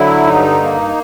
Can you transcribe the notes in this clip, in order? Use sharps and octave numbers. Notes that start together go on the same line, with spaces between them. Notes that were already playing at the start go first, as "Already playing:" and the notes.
Already playing: D3 F#3 E4
G2 D#4
A#3